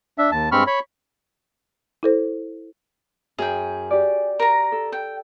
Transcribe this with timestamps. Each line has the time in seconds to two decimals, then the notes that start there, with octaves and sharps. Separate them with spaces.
0.18 D4 E5
0.32 D#2 A5
0.52 G2 G#3 C4 B5 C#6 F6
0.67 C#5 B5
2.03 E4 A4 C5
3.38 F#2 G#4 G5
3.91 G4 D5
4.40 A#4 A#5
4.72 A4
4.92 G5